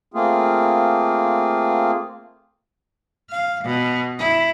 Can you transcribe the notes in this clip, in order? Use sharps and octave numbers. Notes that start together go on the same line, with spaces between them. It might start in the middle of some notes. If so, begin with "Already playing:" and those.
A3 A#3 C4 F4 G#4
F5
B2
E4